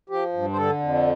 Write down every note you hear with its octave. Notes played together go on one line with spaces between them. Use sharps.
F3 G4
G2
C5
D3 A4
F2